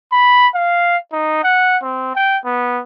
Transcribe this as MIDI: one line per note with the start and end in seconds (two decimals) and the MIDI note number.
0.12 0.48 83
0.55 0.97 77
1.12 1.41 63
1.44 1.77 78
1.83 2.13 60
2.15 2.38 79
2.45 2.80 59